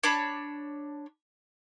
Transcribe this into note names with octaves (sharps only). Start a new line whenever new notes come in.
D4 C#5 A5 B5